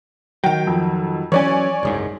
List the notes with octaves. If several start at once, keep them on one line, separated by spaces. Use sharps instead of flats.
D#3 F#3 G5
F2
E3 F#3 C#4 C#5 D5 G#5
F#1 C2 G#2